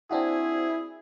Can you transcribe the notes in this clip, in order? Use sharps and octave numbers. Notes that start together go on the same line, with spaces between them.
C4 D4 E4 F#4 G#4